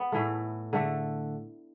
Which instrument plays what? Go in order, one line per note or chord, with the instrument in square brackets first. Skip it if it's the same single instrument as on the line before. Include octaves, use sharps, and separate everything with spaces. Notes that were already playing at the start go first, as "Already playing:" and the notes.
Already playing: [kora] B3
A2 E3 A3
D3 A3